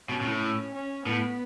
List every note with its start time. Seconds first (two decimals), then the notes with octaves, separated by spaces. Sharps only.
0.09 B2 C#4
0.21 B2
0.26 A2
0.74 C#4
1.06 A2 B3